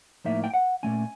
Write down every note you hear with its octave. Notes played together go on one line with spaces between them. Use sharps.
A2 F3 A#3 D#4 E5
G5
F#5
A#2 F#3 A3 C#4 G#5